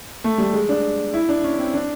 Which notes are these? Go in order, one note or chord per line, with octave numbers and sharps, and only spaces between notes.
A3
G3
G#3
D4
E4
D4
C#4
C4
D4